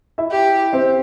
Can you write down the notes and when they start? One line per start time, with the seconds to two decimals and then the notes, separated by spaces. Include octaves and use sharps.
0.18 E4 E5
0.31 G4
0.73 C4 C5